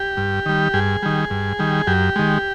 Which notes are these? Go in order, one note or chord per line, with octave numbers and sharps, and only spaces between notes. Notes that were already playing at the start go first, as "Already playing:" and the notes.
Already playing: G4
G2
D#3 G3
G2 G#4
D#3 G3
G2
D#3 G3
F#2 G4
D#3 G#3